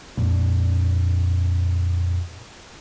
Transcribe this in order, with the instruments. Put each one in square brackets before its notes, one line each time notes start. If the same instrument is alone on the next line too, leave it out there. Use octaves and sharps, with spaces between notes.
[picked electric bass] F2 A#2 D4